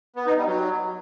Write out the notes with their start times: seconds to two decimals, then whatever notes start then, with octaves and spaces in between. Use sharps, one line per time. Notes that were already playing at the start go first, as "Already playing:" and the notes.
0.16 B3
0.26 D#4
0.36 G3
0.46 F#3